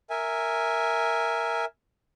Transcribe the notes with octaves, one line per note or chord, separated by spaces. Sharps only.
A#4 E5 G#5